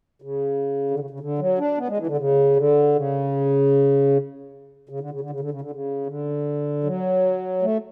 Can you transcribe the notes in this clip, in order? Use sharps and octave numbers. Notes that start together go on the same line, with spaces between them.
C#3
D3
C#3
C#3
D3
F#3
D4
B3
G#3
E3
D3
C#3
D3
C#3
C#3
D3
C#3
D3
C#3
D3
C#3
D3
C#3
D3
F#3
A3